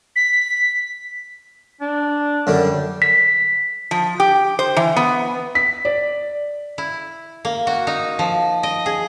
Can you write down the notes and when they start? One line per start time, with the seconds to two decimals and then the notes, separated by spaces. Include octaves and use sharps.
0.16 B6
1.81 D4
2.47 F#2 D3 G3 D4
3.02 B6
3.91 F3
4.20 G4
4.59 C5
4.77 E3
4.97 B3
5.55 B6
5.85 D5
6.78 E4
7.45 A#3
7.67 F#4
7.87 D#4
8.19 F3
8.63 D#5
8.86 G#4